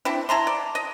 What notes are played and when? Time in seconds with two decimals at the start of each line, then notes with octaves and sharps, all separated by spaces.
0.05 C4 D4 E4
0.29 E4 A5 A#5 C6
0.47 D5
0.75 D#5